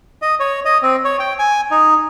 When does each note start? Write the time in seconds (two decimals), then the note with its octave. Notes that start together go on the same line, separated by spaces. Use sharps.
0.22 D#5
0.40 C#5
0.65 D#5
0.82 C4
1.05 C#5
1.20 G5
1.39 G#5
1.71 D#4